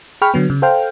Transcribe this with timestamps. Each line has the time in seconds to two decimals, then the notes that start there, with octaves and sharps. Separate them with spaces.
0.22 G#4 G5 B5 C#6 F6
0.34 D3 F#3 B3
0.50 C#3
0.62 A4 C5 F5 G5 F6